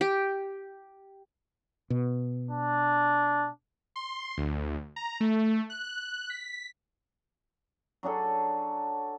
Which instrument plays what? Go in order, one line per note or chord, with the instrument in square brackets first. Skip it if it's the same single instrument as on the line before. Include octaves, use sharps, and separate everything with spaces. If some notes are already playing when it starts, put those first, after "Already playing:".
[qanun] G4
[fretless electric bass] B2
[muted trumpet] D4
[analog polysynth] C6
D2
A#5
A3
F#6
F#6
B6
[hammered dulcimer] F#3 D4 G#4 A4